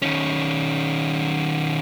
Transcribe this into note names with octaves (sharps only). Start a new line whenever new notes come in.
D#3 C#4